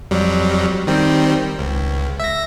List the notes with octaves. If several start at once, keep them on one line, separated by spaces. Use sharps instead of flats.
F2 F#3 G3
D#3 G3 C4
C#2
E5 A#6